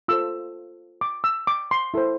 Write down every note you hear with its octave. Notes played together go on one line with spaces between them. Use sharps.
F4 A4 C5 E6
D6
E6
D6
C6
E4 A4 C5